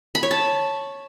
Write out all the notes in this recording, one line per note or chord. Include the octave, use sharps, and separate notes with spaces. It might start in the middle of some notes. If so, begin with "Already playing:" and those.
B5
C#5
A5